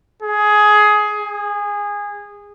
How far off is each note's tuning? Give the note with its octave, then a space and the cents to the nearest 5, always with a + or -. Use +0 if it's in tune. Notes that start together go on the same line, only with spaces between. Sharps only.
G#4 +15
G#4 -20